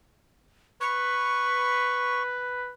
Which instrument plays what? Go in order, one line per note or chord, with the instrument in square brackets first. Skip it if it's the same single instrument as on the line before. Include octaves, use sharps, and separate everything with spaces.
[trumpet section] B4 [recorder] C#6